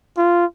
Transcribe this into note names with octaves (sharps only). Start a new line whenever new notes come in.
F4